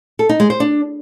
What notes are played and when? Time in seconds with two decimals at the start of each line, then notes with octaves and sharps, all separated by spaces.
0.19 A4
0.29 D#4
0.40 G#3
0.50 C5
0.60 D4